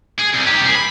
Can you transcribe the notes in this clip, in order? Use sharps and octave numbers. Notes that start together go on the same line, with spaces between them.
G#4
C2
D#3 G4
C2 G#4
B5